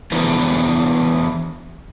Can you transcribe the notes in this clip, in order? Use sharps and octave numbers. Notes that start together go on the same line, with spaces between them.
E3 B3 D4 E4 A#4 C5